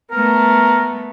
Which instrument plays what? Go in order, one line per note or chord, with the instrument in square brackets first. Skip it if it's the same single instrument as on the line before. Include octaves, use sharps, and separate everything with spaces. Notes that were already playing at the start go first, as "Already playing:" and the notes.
[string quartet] A3 B3 [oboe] A#4